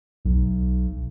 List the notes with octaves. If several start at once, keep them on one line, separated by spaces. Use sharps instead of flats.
B1